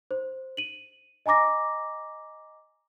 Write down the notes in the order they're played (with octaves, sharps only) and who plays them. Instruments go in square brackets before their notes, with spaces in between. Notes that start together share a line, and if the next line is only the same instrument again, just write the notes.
[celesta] C5
D#7 F#7
D#5 G#5 A#5 D6 A#6